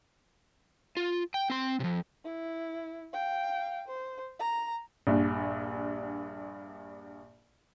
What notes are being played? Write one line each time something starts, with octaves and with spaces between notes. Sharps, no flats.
F4
G5
C4 C6
F2 C3
E4
F5 G5
C5
A#5
A#1 G2 A#2